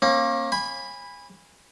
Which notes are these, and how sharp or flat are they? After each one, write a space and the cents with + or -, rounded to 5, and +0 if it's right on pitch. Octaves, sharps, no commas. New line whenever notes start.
A#3 +0 C#4 -45
G#5 -30 B5 +0